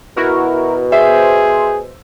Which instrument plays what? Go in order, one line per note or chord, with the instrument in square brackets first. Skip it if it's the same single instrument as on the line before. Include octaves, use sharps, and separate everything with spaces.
[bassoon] B2 [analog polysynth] E4 F#4 A#4
[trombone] G#4 [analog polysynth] C5 [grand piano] E5